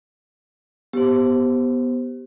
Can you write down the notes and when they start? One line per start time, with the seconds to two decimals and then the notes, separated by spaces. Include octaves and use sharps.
0.93 B3 G4 C5